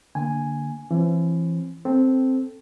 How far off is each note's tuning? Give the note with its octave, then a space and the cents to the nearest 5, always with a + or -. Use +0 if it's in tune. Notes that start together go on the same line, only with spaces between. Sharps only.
D3 +0 A#3 +0 G#5 -5
E3 +35 C4 +35
C4 +0 A4 +0